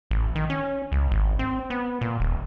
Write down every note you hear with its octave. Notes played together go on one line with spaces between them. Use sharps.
A1
D#3
C#4
C#2
G#1
C4
B3
A#2
D#1